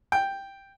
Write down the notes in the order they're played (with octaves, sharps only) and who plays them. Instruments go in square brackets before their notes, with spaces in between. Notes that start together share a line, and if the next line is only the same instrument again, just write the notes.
[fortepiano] G5